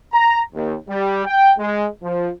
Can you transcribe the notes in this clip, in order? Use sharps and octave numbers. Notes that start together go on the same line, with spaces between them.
A#5
D#2
G3
G5
G#3
F3